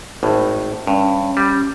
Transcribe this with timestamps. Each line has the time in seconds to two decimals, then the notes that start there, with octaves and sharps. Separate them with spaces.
0.23 G#1 A2
0.87 G2 C#4
1.37 G3